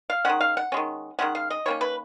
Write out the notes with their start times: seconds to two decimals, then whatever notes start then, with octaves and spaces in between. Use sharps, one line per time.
0.10 F5
0.25 D#3 G#3 C#4 F#5
0.41 F5
0.57 F#5
0.72 D#3 G#3 C#4
1.19 D#3 G#3 C#4 F#5
1.35 F5
1.50 D#5
1.66 D#3 A#3 C#4 C#5
1.81 B4